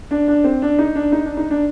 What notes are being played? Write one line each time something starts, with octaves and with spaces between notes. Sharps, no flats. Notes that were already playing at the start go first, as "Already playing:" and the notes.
D4
D4
C4
D4
D#4
D4
D#4
D4
D#4
D4